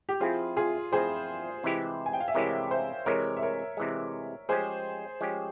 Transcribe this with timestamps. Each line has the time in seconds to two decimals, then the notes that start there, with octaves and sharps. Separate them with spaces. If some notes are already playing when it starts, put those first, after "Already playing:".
0.09 G4
0.20 F3 C4 E4 F4 G#4
0.57 F4 G#4
0.92 F3 C4 E4 G#4 C5
1.63 C3 E3 G#3 E4 G4
2.06 G#5
2.13 G5
2.20 F5
2.28 E5
2.35 C3 E3 G#3 E4 G4 A#4 C#5
2.71 C5 E5
3.06 C3 E3 G#3 A#4 C#5
3.37 E5
3.42 A#4 C#5
3.77 C3 E3 G#3
4.49 F3 G#3 C#4 G4 G#4 C5
5.21 F3 G#3 C#4 G4